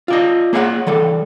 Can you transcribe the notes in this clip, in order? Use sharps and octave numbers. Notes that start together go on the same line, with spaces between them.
F4 D5 D#5
A#3 G#4 C#5 F5 F#5
E3 G3 A4